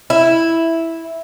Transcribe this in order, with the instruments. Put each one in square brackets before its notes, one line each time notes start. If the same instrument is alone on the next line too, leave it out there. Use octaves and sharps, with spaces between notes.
[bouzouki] E4